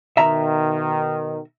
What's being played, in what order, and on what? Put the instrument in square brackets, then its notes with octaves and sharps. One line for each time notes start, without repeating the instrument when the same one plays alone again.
[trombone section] B2 D#3 [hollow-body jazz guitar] E5 A#5